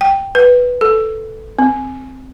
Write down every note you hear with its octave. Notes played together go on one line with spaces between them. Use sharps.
G5
B4
A4
C4